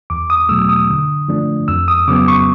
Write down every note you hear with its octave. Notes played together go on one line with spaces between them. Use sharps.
E2 D6
D#6
B2 F#3 A3 E6
D#6
D3
F3 A3 D4
F2 E6
D#6
C#3 F#3 B3 D6
C#6